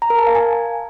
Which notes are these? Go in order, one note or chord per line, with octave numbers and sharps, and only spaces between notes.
A#5
A#4
A5
F5
G#5